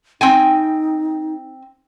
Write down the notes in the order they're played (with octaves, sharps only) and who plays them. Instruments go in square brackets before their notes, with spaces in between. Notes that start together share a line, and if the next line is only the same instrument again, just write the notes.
[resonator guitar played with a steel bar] C4 G5 G#5 [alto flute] D#4